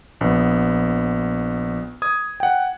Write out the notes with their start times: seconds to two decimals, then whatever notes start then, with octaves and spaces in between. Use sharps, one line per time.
0.21 A#1 B3
2.02 D#6 G#6
2.40 F#5 G5